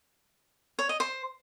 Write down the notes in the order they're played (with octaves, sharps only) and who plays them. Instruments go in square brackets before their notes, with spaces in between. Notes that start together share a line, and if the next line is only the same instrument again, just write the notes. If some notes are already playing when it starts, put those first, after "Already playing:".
[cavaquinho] C#5
D#5
C5